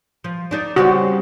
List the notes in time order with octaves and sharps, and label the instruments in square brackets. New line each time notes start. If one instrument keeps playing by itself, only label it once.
[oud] F3
D4 D#4 D5
[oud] C#3 G3 C4 [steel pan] F#4